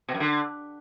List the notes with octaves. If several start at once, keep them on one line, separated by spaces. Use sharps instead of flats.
B2
F#2
D3